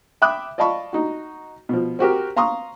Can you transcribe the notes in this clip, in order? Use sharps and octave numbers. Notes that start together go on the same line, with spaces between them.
E5 G5 B5 D6 D#6 F#6
D5 D#5 F5 A5 B5 C#6
D#4 F#4
B2 F3
C4 F#4 G4 A#4
F5 A#5 C6 C#6 D#6